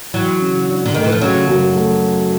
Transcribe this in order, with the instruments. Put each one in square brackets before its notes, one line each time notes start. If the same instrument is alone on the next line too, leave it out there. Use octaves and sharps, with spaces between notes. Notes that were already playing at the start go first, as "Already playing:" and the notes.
[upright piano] E3 [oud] F#3
[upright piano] C#3
D4
[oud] D3
[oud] D#3 [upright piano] A3
[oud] E3
F3
[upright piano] C#3 [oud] F#3
[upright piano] F#2
A3